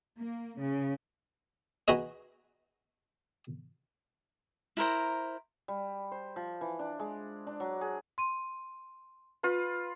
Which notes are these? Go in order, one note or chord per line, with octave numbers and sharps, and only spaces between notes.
A#3
C#3
D#4 F#4 G#4 B4 D#5
E4 A#4 C5 A#5
G3
C5
F3
E3
D4
G#3
D4
F#3
G#4
C6 D#7
F4 B4 B5